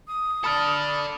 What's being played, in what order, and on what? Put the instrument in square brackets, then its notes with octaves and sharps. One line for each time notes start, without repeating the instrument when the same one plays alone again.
[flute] D#6
[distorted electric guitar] A4 D5 [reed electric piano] A5 B5 F6